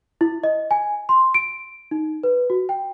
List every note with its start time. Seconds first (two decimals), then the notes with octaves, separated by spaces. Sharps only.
0.21 E4
0.44 D#5
0.71 G#5
1.09 C6
1.34 D7
1.91 D#4
2.23 B4
2.50 F#4
2.69 G5